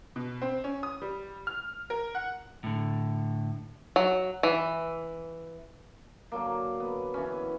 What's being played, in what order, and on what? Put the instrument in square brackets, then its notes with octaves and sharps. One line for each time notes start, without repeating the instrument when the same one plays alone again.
[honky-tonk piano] B2
C4
C#4
D#6
G3
F6
A#4
F#5
[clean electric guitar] A2 D3
[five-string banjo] F#3
E3
[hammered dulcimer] D3 F#3 A#3
B3
E3 C#4
B3